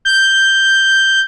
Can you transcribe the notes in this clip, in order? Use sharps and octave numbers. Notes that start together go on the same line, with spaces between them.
G6